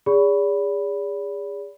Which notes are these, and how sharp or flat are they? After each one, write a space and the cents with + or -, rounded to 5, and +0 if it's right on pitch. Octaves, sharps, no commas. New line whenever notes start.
G#4 -35 D5 -40 B5 +0